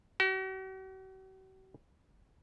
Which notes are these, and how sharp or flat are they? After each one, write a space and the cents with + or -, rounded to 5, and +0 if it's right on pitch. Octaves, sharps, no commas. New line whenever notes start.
F#4 +45